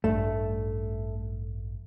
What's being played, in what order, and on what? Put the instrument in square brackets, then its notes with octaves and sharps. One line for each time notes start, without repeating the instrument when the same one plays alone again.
[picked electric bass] A1 G2 [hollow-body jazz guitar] A3